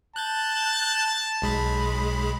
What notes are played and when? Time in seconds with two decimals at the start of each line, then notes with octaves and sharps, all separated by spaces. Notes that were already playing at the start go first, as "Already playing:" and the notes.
0.16 A5 F#6 G6 A6
1.42 B1 G#3 B5